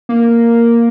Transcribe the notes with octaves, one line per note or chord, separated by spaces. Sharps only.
A#3